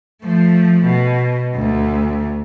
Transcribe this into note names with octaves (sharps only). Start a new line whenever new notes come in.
F3 A3
B2
D2